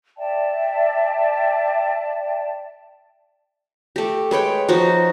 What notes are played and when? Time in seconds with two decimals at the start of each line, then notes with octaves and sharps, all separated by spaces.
0.18 D5 E5 G5 A5
3.96 A3 G4
4.31 G#3 B4 C#5 G5
4.69 F3 D#4 F#4